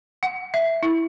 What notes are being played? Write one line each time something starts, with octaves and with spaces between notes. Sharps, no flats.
F#5
E5
E4